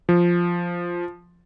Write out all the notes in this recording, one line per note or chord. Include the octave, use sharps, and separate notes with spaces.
F3